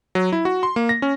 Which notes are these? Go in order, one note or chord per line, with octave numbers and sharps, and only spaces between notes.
F#3
E4
F#4
C6
A#3
A#6
C#4